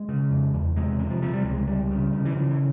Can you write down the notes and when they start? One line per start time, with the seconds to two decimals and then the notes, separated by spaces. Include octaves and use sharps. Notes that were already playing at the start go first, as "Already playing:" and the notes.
Already playing: G#3
0.09 C#3
0.31 F2
0.54 E2
0.76 C3 G#3
1.00 C3
1.10 F3
1.22 C3 F3
1.34 G3
1.45 C#2 G#3
1.67 C#2 G3
1.91 C#3
2.13 C#3
2.25 E3
2.35 C#3 F3
2.51 E3